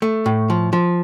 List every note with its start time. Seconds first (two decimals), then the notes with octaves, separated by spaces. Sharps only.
0.02 A3
0.26 A2
0.50 F3
0.73 F3